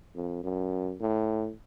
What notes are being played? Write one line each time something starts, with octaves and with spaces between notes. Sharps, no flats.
F2
F#2
A2